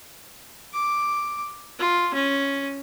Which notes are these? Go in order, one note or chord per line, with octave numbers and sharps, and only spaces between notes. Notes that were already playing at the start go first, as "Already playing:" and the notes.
D6
F4
C#4